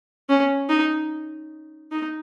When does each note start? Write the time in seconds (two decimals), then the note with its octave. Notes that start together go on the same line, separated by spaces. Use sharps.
0.29 C#4
0.69 D#4
1.92 D#4